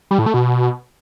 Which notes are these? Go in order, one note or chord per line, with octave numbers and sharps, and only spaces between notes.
G3
A2
A3
B2